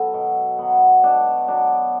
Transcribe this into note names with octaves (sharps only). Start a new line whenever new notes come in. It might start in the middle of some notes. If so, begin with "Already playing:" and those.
Already playing: F#3 B3 A4
B2
F#3 B3
B2 D4
F#3 B3 D4